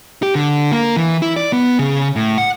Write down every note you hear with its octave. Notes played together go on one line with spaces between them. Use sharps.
G4
D3
A#3
E3
E4
D5
B3
C#3
A2
F#5